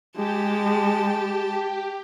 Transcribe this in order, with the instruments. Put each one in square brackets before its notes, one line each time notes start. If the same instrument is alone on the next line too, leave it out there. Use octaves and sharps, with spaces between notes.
[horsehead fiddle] G#3 [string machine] G4 [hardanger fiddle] A5